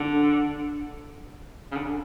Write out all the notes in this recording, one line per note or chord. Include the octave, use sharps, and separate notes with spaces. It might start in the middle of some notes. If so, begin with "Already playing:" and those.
Already playing: D3
C#3
D3